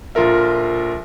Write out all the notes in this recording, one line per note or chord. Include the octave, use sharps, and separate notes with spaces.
A#1 F4 A4 A#4 E5